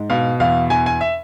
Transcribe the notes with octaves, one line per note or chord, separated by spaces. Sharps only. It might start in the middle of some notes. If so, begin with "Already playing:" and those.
Already playing: G#2
B2 F5
E2 F5
E2 G#5
G#5
E5